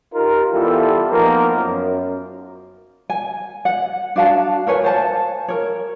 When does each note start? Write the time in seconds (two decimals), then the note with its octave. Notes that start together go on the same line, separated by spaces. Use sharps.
0.14 D#4 F4 G4 A#4
0.52 E3 G3 B3 F4 G4 A4
1.11 F3 A#3 B3 D#4 A#4
1.55 F#2
3.10 G#5
3.65 F#5
4.16 D4 F#4 F5 A5
4.67 A#4 B4 C#5 G#5
4.84 C5 F5 G#5 A5
5.48 A#4 C#5